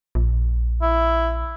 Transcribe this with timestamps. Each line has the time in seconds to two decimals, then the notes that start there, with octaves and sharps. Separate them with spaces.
0.15 A#1
0.82 E4